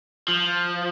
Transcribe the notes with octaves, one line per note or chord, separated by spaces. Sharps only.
F3